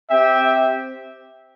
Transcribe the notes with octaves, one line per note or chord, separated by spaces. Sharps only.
C4 G4 E5 G5